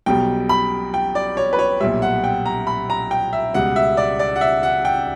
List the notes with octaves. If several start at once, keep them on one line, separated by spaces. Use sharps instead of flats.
B1 B2 G3 G5
B5
G5
D5
C#5
B4
C#5
B1 A#2 G3 E5
F#5
G5
A#5
B5
A#5
G5
E5
C#2 B2 G3 F#5
E5
D5
D5
F#5
E5
F#5
G5